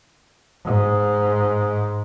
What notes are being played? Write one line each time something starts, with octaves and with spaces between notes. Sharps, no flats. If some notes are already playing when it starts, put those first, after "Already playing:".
G#2